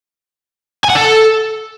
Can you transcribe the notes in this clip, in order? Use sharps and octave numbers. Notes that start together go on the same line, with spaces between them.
G#5
F#5
A4